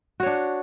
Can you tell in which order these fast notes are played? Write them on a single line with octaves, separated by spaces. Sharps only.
F#4 C#5 D4